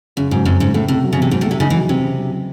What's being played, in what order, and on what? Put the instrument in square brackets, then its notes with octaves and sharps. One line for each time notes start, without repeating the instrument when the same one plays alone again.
[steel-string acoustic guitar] F#2 [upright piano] C#3
[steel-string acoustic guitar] G#2 [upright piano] F#3
[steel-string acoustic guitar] F#2 [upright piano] C4
[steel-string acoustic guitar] G#2 [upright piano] C#3
[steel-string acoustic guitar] A2 [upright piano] A3
[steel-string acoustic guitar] A2 [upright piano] C3
[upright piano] F#3
[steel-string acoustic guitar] C#3
[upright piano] E2 [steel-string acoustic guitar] C3
[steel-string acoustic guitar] G#2 [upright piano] F#3
[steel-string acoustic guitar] A2
[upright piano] A3
[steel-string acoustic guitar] C3
[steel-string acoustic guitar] C#3 [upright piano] D#4
[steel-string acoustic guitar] E3
[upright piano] F#3
[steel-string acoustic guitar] C3 [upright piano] C4
[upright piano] C#3
F#3